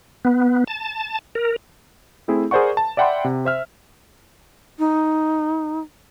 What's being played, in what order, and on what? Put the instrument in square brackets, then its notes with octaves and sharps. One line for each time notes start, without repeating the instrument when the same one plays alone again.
[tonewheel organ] B3
A5
A#4
[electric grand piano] A3 C4 E4 G#4
G#4 A#4 C5 D5 F#5 C#6
A5
D5 E5 F#5 G5 B5 C6
C3
C5 E5 F6
[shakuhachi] D#4